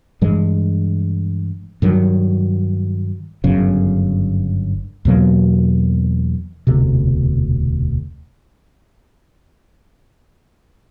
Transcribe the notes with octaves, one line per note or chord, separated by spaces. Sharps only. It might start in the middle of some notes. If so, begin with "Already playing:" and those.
G2 E3 G#3
G2 D#3 F#3
G1 F#2 C#3
E2 B2 F#3 A#3
E1 D2 C3